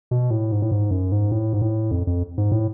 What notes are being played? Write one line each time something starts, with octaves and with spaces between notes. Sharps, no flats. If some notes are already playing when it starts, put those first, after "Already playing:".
B2
A2
G#2
A2
G#2
F#2
G#2
A2
G#2
A2
F2
F2
G#2
A2